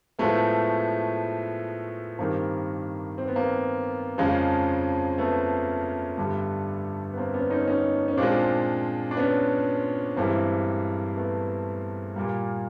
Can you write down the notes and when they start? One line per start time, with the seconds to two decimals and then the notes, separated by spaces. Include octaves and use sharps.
0.19 A2 F3 G#3 A3 B3
2.19 G2 D#3 G3 A#3 C4
3.18 C4
3.28 B3
3.36 A#3 C4
4.18 F2 C#3 F3 G#3
5.18 A3 B3
6.18 G2 D3 G3
7.13 B3
7.18 A#3 C4
7.34 B3 C#4
7.50 C#4 D#4
7.68 C#4 D#4
8.08 C#4
8.17 A#2 F3 G#3 C4 D4
9.11 D4
9.17 B3 C#4
10.17 G2 E3 G#3 A#3 C4
11.16 A3 B3
12.16 A#2 G3 A#3